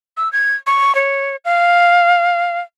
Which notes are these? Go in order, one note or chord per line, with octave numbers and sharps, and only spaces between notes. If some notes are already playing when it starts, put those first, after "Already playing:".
E6
G#6
C#6
C#5
F5